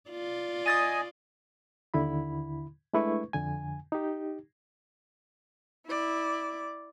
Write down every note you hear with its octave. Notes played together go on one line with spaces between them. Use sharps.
F4 D5
D#5 G#5 D#6 A6 D#7
D#2 D3 E4 B5
G#3 A3 D4 E4 B4 C#6
F2 D3 G#5
D#4 G4
E4 D5